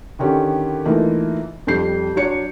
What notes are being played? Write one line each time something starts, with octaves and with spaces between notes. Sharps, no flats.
D3 D#3 C#4 G4
E3 A3 A#3 D#4 F4
F2 G3 G6 C7
F#3 D4 C#5 C#7